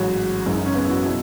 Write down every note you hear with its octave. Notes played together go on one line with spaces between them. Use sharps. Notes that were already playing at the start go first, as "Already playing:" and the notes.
Already playing: A1 G#2 F#3 F#4
F#1 F#2 E3 G#3 E4
D#4
C#4
B3
E4
F#4
B2 F#3 E4